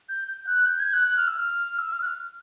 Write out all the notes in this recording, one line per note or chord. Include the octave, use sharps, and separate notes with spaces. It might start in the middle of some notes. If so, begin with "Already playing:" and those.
G6
G6
F#6
G6
G#6
F#6
F#6
F6
E6
F6
E6
F6
F#6
F6